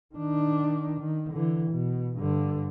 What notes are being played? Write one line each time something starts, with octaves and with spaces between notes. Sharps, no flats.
D#3 D4
D#3
D3 E3
B2
G2 D3